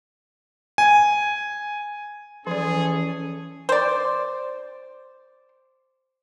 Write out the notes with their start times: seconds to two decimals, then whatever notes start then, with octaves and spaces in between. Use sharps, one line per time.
0.78 G#5
2.47 E3 F3 C#4 G#4 A4 D5
3.69 C5 D5